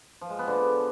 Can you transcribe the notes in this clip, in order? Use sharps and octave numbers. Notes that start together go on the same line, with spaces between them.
F3
G#3
B3
D3